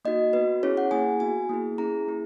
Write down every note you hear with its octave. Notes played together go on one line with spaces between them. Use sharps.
A#3 D#4 F#4 D#5
B3 F#4 B4
C#4 E4 G#4 C#5
F#5
A#3 E4 G#4 G#5
B3 F#4 G#5
A#3 E4 G#4
C#4 E4 G#4 A#5
A#3 E4 G#4